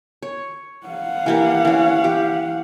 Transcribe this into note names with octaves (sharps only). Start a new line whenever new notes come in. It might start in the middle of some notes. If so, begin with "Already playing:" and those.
C#5
F5 F#5
E3 A#3 G4
E3 C#4
G4